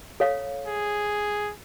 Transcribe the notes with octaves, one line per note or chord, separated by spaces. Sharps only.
A4 C#5 F5
G#4